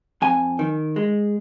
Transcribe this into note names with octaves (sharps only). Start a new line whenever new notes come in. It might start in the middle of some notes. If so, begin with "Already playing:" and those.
F2 G#5
D#3
G#3